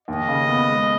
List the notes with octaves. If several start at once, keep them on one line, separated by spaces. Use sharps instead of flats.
D#2 D#5
C#3
B3
G#3